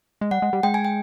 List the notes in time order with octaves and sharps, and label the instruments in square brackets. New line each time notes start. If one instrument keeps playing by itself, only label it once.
[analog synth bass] G#3
[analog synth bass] G3 [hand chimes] F#5
[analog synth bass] G#3
G3
[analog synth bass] G#3 [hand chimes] G5
[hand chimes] G#5
G5